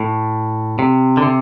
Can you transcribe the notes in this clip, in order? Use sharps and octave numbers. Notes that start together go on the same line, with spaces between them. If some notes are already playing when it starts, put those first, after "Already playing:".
Already playing: A2
C3
D3
C3